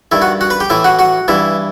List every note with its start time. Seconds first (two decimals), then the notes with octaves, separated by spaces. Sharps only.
0.11 G2 D#3 E4 E5
0.22 F#4 F#5
0.41 F#4 F#5
0.50 B4 B5
0.60 G4 G5
0.70 A2 E3 E4 E5
0.84 F#4 F#5
0.99 F#4 F#5
1.28 G2 E3 E4 E5